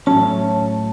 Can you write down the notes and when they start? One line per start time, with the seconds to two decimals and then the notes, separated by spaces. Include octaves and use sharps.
0.06 A2 F#3 C#4 A5